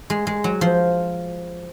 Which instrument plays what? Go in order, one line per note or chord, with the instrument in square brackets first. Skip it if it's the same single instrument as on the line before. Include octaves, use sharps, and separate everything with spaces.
[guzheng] G#3
G#3
F#3
F3